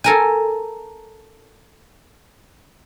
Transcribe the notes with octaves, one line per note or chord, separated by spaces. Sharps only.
A4 A#4 G#5